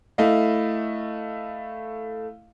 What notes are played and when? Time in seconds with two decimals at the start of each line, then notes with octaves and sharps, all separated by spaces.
0.18 A3 E4 D#5 F5